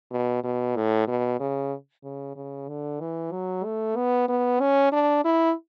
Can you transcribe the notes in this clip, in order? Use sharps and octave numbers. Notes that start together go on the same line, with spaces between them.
B2
B2
A2
B2
C#3
C#3
C#3
D3
E3
F#3
A3
B3
B3
C#4
D4
E4